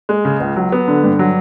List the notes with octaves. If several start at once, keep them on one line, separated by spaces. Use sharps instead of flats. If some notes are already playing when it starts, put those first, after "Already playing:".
G#3
C#3
C#2
F#3
B3
D3
G2
F#3